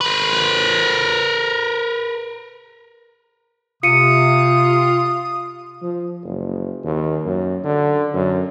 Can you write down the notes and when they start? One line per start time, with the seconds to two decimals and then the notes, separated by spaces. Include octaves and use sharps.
0.01 A#4 B4
3.83 C3 F4 D#6 C#7 D#7
5.82 F3
6.25 F#1
6.84 D#2
7.26 F#2
7.64 D3
8.14 F#2